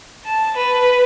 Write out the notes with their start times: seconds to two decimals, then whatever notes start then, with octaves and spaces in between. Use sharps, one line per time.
0.24 A5
0.56 B4